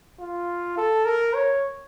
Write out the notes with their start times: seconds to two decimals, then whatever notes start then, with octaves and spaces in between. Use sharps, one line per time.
0.20 F4
0.78 A4
1.06 A#4
1.34 C#5